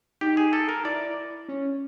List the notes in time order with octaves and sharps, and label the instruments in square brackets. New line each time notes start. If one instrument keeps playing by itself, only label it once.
[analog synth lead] D#4 [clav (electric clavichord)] G4
[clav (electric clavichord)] G#4
A4
A#4
[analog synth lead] E4 [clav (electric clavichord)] D5
[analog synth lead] C#4